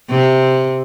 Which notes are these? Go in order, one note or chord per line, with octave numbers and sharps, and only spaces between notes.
C3